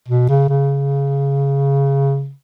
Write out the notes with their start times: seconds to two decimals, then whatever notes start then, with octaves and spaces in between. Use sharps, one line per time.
0.08 B2
0.29 C#3
0.49 C#3